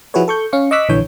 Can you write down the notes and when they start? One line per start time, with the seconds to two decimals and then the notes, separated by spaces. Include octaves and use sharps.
0.14 F3 E4 F#4 G#4 B4 C#5
0.28 A4 C#6 G6
0.53 C#4 F5 C#6
0.71 D#5 C#6 D6 E6 F#6 B6
0.89 A#1 D3 E3 C#5 G6